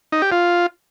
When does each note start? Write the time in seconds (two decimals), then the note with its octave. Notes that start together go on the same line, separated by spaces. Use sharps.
0.12 D#4
0.22 G4
0.32 F4